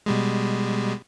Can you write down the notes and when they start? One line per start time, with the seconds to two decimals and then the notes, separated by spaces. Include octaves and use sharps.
0.06 B2 G3 G#3